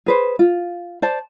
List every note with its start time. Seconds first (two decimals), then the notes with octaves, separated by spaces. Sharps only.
0.06 G#4 B4 C5
0.39 F4
1.02 C5 D5 A5